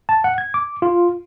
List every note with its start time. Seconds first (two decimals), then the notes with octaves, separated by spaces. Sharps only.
0.09 A5
0.24 F#5
0.38 G#6
0.54 D6
0.82 F4